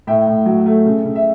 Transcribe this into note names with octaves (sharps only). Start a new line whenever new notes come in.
A2 E5 G5
A2
F#3
A3
C#3
C#3
E5